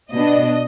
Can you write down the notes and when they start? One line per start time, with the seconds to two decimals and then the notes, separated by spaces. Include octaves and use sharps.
0.13 B2 B3 D4 D#5